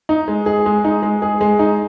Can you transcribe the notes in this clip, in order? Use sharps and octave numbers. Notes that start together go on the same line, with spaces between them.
D#4
G#3
G#4
G#3
D#4
G#3
G#4
G#3
D#4